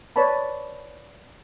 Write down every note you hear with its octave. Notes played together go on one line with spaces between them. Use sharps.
B4 C#5 D5 A5 B5